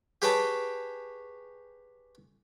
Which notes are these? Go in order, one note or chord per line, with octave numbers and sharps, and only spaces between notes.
G4 G#4 B4 C#5 G5 A5